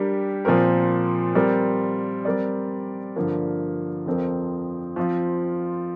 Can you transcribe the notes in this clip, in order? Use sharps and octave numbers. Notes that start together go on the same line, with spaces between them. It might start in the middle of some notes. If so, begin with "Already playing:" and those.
Already playing: G3 D4 G4 A#4
A#2 F3 C4 A#4
G3 C4 A#4 D5
G3 C4 A#4 D5
G2 D3 F3 A#3
F2 F3 C4 A#4
F3 C4 F4